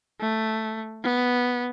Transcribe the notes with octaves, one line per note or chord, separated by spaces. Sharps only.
A3
B3